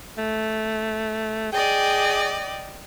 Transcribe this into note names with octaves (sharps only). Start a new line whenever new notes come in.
A3
G#4 D5 D#5 G5